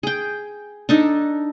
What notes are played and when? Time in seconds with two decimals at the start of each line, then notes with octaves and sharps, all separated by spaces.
0.03 G#4 G5
0.89 D4 D#4 A4